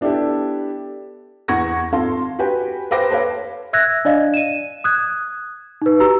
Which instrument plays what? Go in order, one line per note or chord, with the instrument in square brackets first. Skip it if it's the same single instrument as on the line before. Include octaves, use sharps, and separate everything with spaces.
[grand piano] B3 D4 E4 G4 A4
[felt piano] E2 F#5 C#6 G#6 A#6
G#1 F4 A4 F5 C6
F#4 G4 B4 G5 G#5
B4 C5 F5 G5 D6 A#6
A4 B4 C#5 F5
[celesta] E5 E6 F#6 G#6 A#6
D4 D5 D#5 F5
D#7 E7
D#6 F#6 G#6
D#4 B4
F#4 G4 A#5 E6